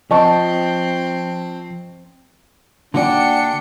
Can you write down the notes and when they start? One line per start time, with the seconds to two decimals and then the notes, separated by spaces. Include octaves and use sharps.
0.11 F3 C4 D#5 A5 C#6
2.94 D3 A#3 D4 F#4 D5 G5 G#5 C#7